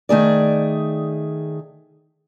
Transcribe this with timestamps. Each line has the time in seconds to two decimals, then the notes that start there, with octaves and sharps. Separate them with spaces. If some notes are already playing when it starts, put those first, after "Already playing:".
0.09 D#3 A3 G#4 D5